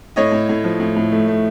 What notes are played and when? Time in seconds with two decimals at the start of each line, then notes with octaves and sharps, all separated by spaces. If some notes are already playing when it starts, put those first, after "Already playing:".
0.16 A2 C#5 D#5
0.32 A2
0.49 A2
0.64 F3
0.80 A2
0.96 A2
1.12 A3
1.28 A3